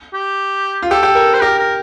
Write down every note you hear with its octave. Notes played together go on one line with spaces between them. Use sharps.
G4
F4
G4 A4
G4
A#4
C5
G4 A#4
A#4